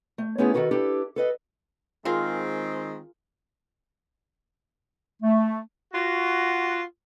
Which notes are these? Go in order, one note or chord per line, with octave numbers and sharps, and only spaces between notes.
A3
A3 B3 C#4 E4 F4 G#4
D#3 F#3 F#4 A4 B4
D4 E4 G4 A4 B4
A4 B4 D#5
D#3 G#3 C4 F4 G#4 A#4
A3
F4 F#4